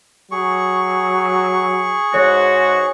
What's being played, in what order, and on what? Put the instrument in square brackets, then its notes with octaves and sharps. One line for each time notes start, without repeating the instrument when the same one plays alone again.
[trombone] F#3 [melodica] G#4 C#6
[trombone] G#2 [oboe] F#4 [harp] C#5